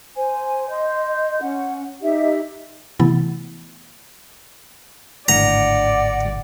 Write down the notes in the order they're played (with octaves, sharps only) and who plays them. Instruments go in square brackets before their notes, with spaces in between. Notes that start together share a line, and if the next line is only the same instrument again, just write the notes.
[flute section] C5 G#5
D#5 C6 G6
C#4 F#5
D#4 G4 D#5 E5
[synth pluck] C3 E3 A3 B3 E4 A6
[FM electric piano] G#1 A2 D3 [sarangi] D5 [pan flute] F#5 [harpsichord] A#5